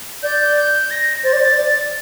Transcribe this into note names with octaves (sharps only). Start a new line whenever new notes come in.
D5 G6
G6
A#6
C5 A6
D5
C5
D5